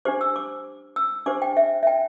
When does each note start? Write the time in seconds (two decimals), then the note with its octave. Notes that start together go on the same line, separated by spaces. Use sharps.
0.05 D4 G4 C5 D6
0.21 E6
0.36 D6
0.96 E6
1.26 D4 G4 C5 D6
1.42 G5
1.57 E5
1.83 E5
1.87 G5